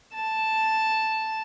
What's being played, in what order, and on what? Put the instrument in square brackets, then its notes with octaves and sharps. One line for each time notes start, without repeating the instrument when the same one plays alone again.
[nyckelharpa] A5